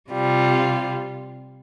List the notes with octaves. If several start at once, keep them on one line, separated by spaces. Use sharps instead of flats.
C3 G3 F4